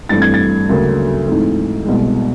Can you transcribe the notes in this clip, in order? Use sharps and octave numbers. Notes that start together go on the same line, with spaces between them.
G2 E3 A3 C4 A6
G#6
A6
D2 C#3 F#3 A#3
G#2 E3 A3 C4
C2 B2 G#3